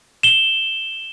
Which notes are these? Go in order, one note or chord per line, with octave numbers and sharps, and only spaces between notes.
E7 G7